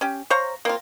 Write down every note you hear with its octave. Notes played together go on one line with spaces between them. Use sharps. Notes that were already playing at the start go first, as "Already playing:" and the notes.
C#4 G4
C5 C#5 F5 A#5
A#3 C4 F4